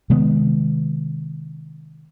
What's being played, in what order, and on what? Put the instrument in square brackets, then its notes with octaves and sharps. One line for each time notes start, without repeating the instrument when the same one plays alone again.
[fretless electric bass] C3 D#3 G#3 B3